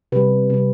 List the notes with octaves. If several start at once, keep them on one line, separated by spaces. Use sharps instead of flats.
C3 G3 B4
C3 G3